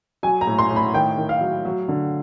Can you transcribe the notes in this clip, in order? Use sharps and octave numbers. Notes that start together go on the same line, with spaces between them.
F#3 G#5
A#5
A2
C6
A2
B5
D#3 G5
D#3
F5
F#3
F#3
D3